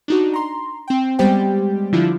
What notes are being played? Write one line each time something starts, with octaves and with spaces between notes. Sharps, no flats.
D4 D#4 F#4
A#5 C6
C4 G5
G3 G#3 B3 G4 C5 G5
D3 F3 D4 E4 F4